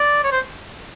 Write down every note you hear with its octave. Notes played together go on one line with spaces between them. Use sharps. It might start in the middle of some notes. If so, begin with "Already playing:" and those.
Already playing: D5
C#5
C5